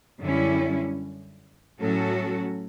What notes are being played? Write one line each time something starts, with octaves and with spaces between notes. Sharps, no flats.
F#2 D3 G3 C#4 E4
A2 F#3 C#4 F#4 A4